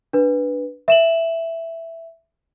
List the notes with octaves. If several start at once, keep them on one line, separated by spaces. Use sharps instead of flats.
D4 B4
E5 E7 F#7